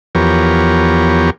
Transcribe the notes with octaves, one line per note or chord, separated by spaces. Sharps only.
E2 F3 B3 G4 A#4 C#5